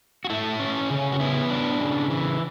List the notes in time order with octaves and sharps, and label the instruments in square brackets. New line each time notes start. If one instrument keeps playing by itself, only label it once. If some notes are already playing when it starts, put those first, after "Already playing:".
[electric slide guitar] F#4
A3 E4
C#4
C#3
F#4
B3 E4
D4
C#3
E3